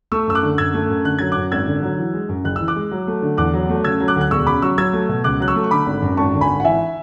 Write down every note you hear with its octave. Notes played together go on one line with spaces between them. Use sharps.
A3 C#6 E6
F#2 E6
D6 F#6
D3
F#2 E6 G#6
A3
F#2
D3 F#6
F#3 G#6
F#2 D6 F#6
G#1 E6 G#6
D3
F#3
E3
G#3
F#2
F#1 F#6
E3 E6
D6 F#6
G#3
F#3
A3
D3
E2 D6 F#6
F#3
A3
C#3 E6 G#6
F#3
D6 F#6
D2
F#6
E1 C#6 E6
C#3 B5 D6
F#3 C#6 E6
F#3 E6 G#6
A3
B2
C#2 D6 F#6
F#3 F#6
C#6 E6
A3
C#6
D3 B5 D6
G#1
F#2
G#1 A5 C#6
D3
G#5 B5
G#1
F#5
E3 E5 G#5